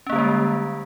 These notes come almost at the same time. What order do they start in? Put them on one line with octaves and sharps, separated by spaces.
C#4 A#3 D3 G3 G#3